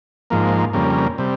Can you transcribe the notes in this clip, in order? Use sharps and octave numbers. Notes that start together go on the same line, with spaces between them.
G#2 F3 A#3
F2 C#3 G3 A#3
C3 G3